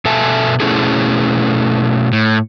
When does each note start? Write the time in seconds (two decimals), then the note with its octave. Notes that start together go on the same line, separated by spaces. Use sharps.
0.05 B2 A4 E5 G#5 A5
0.60 B2 A3 C#4 E4 G#4 A4
2.13 A2